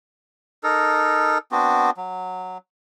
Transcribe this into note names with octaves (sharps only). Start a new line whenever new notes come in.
D#4 A4 A#4
B3 C4 D4 F#4
F#3